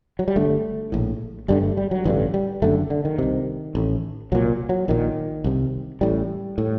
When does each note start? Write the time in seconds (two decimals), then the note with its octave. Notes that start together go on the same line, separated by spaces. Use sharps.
0.19 F#3
0.28 G3
0.36 G1 G2 D3 A3
0.92 A#1 A2
1.48 G1 G2 D3 G3
1.63 A3
1.77 G3
1.91 F#3
2.05 A1 G2 D3 D#3
2.34 G3
2.62 F#1 F#2 D3 A3
2.90 D3
3.05 D#3
3.18 C2 C3
3.75 A1 A2
4.32 C2 A#2 F#3
4.69 F#3
4.88 A#1 A#2 D#3
5.44 C2 C3
6.01 A1 A2 G3
6.58 A2